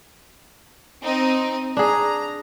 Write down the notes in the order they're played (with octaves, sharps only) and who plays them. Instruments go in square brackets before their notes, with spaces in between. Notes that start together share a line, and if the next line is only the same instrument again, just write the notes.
[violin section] C4 D#4
[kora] D4 G#4 [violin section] A#5